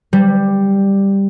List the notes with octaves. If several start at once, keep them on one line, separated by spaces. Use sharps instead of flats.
G3